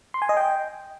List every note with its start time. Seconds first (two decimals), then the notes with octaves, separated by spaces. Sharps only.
0.14 C6
0.22 G#5
0.29 D#5
0.37 G5